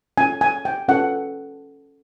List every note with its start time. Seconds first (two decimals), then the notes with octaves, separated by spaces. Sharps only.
0.18 C#4 F4 A4 G#5
0.41 G#5
0.65 G5
0.88 C#4 F4 A4 F#5